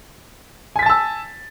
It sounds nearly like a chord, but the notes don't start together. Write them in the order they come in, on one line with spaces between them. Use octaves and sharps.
G#5 B6 A6 A5 E6